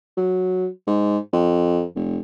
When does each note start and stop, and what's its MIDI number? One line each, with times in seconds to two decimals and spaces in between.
0.17 0.67 54
0.87 1.17 44
1.33 1.83 41
1.95 2.19 29